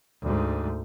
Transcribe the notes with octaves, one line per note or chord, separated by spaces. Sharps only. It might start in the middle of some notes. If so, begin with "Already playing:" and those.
D2 G#2